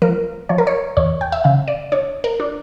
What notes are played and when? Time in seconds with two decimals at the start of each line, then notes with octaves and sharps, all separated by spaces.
0.02 F3 A#4
0.49 F3 C#5
0.58 A#4
0.67 C#5
0.97 E2 C#5
1.21 G5
1.32 E5
1.44 C#3 F5
1.68 D5
1.92 D4 C#5
2.24 A#4
2.40 D4